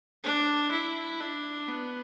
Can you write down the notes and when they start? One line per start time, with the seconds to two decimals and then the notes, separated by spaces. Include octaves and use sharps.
0.24 D4
0.72 E4
1.20 D4
1.68 B3